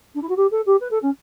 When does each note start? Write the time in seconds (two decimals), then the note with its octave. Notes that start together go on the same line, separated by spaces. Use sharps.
0.14 D4
0.22 E4
0.29 F#4
0.36 G4
0.51 A4
0.66 G4
0.80 B4
0.90 A4
1.02 C#4